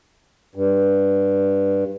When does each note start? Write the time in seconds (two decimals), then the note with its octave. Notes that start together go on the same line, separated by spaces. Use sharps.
0.56 G2